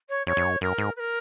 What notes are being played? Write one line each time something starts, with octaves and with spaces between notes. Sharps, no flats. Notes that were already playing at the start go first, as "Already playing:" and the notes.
C#5
F2 C#5
F2
F#2
F#2 A#4
G#2
B4
A#4